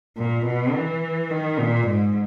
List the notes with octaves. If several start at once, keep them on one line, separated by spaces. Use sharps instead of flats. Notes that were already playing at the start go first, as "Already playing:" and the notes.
A#2
B2
E3
D#3
A#2
G#2